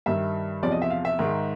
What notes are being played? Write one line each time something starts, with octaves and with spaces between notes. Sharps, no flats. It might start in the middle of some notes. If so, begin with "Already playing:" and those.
G2 D#3 G3 E5
E2 C3 F3 D5
D#5
E5
F5
E5
G#2 D#3 G#3